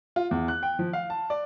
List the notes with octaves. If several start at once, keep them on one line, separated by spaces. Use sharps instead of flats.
F4
E2
F#6
G5
F3
F5
A5
D5